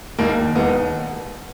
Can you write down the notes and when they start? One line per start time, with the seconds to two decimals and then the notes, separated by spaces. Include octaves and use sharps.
0.18 E1 D#2 D#3 A#3
0.55 E1 D#2 D#3 B3